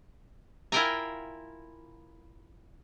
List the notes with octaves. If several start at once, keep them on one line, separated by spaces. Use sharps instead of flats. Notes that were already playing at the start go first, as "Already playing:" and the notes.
E4 F4 A#4 G5 G#5 A#5